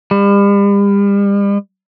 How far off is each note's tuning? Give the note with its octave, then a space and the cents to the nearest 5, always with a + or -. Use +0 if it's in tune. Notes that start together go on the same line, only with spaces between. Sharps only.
G3 +40